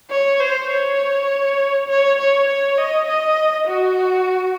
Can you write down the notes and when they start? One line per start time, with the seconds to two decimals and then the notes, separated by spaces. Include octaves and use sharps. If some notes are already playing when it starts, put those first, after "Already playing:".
0.10 C#5
0.40 C5
0.71 C#5
1.88 C#5
2.18 C#5
2.48 C#5
2.78 D#5
3.07 D#5
3.67 F#4